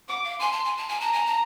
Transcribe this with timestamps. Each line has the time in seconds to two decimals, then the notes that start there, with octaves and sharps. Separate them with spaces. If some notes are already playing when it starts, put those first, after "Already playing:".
0.09 F#5 D6
0.24 F5
0.39 G#5 C6
0.52 A5
0.65 G#5
0.77 A5
0.89 G#5
1.01 A5 A#5
1.13 G#5
1.26 A5